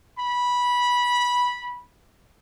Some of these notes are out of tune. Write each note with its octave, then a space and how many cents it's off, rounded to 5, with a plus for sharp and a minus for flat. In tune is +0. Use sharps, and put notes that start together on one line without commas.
B5 -15